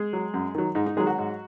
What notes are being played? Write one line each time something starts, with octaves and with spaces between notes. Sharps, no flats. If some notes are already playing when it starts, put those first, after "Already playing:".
Already playing: G#3 G#4
F#3
F#2
D#3 F#3
G#2 D#4
D#4
D#3 F#3 G#3 G#4
F#3 F#4
G#2